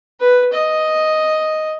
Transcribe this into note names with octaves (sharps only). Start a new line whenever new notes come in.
B4
D#5